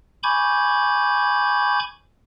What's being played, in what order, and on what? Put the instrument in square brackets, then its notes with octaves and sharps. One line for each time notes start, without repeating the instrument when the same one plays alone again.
[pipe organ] G#5 B5 C#6 D6 G6 G#6